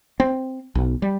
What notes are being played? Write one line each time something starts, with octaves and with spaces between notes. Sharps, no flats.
C4
B1
G3